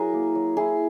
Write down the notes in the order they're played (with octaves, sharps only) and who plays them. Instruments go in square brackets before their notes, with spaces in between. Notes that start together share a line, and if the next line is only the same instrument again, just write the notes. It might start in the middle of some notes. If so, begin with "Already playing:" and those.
Already playing: [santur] F#3 E4 G#4 A#4
A#3
F#3
E4 G#4